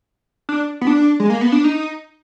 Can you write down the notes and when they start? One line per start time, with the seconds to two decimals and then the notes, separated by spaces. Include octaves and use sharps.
0.49 D4
0.81 B3
0.87 D4
1.20 G#3
1.30 A#3
1.41 B3
1.52 D4
1.64 D#4